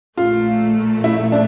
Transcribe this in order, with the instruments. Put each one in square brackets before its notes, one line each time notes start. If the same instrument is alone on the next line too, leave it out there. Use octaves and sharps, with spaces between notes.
[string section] A#1 A#2 A3 [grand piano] F4
[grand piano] E4
D4